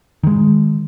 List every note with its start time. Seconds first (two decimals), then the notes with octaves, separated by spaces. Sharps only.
0.23 D#3 G#3